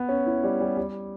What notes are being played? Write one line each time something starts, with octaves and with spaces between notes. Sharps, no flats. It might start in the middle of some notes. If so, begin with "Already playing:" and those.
Already playing: B3
C#4
E4
G3
G3
G3